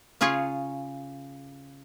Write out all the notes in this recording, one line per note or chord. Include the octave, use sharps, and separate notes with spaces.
C#3 C#4 F4 G#4 C#5